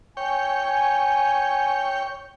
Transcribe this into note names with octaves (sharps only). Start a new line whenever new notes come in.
C#5 G5 G#5